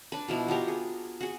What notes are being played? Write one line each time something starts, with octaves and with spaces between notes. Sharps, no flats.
D4 B4
B2 F3 E4
B3 F4 G4 A#4
G#4
F#4 G#4